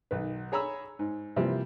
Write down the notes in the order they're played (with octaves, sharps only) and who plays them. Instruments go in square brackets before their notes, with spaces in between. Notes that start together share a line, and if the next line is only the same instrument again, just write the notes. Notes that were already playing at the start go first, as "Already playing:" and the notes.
[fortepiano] B1 D#3 B4
G#4 C#5 A#5 B5 E6
G#2
C3 E3 F3 G3 A#3